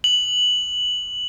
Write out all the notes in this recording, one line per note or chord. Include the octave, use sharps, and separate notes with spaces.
F#7